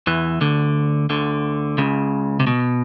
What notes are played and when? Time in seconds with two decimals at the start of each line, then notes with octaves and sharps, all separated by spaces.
0.07 E2 E3
0.41 D2 D3
1.10 D2 D3
1.78 C#2 C#3
2.40 C3
2.47 B2